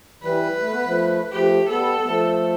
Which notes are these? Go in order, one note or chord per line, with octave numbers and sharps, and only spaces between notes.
E3 G3 B4
A3
B3
F3 A3
F3 A3 G4
G3 B3 A4
B3
F3 A3